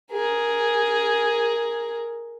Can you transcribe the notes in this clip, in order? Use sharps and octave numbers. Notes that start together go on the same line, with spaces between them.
G#4 A#4